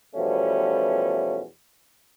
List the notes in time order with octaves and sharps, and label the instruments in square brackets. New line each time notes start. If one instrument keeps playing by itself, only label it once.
[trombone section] E2 B2 F3 G3 A3 C#4